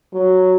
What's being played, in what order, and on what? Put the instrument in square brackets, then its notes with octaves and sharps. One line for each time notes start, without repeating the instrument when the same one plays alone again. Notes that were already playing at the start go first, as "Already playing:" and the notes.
[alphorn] F#3